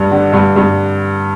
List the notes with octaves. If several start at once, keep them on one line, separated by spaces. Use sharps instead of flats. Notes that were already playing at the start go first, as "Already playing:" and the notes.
Already playing: G2
D3
G2
G2